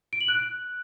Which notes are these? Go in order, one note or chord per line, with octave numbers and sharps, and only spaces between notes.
D7
F#7
F#6